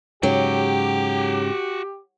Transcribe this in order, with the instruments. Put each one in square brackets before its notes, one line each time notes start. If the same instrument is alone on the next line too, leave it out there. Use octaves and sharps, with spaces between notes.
[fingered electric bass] G#2 C#3 [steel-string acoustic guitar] F#3 [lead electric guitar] F#4 G5 [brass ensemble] G4